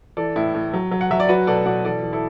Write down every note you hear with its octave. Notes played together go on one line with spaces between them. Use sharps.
E3 A4 D5
A2 E4
A2
F#3
F#3
F#5
F#3 E5
D5
F#3 F#4 B4
B2 A4 D5
B2 D5 F#5
E3 A4 D5
E3
E4 A4